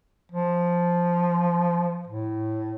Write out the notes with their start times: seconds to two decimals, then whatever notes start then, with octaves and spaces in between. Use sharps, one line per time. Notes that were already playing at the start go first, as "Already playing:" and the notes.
0.32 F3
2.07 A2